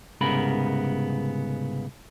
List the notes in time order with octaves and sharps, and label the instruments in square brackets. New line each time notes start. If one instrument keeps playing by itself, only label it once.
[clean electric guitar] C2 G#2 C#3 B3 A#4 B5